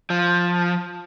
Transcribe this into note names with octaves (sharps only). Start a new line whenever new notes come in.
F3